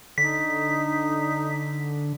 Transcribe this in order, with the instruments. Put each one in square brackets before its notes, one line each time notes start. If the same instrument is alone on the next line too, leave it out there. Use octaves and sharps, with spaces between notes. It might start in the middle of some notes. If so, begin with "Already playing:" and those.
[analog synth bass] D3 [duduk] D#4 [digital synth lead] B6